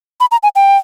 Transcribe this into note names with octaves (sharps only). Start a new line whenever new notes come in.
B5
A#5
G#5
G5